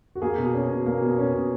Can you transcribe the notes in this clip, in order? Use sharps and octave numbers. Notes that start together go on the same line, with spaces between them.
F#4
A#3 G#4
B2
C#4
B2
A#3
B2
C#4
B2